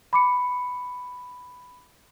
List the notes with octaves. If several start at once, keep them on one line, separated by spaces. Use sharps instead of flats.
B5 D6 C#7